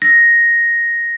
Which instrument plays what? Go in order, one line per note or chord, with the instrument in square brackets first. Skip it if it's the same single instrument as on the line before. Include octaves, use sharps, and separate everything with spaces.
[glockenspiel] A#6